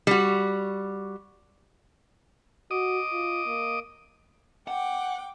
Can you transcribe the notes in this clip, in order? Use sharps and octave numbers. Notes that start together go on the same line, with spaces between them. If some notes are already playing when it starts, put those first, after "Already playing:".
G3 F#4
F#4 D#5 D6 D#6
F4
A#3
F#5 G5 D6